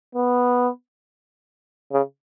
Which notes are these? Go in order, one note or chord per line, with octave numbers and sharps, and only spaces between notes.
B3
C#3